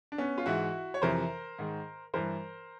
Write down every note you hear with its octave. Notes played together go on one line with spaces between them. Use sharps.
D4
B3 C#4
F4
G#2 E3 E4 F#4
C#5
F2 C3 E3 A#4 C5
G#2 D#3
G2 E3 A#4 C5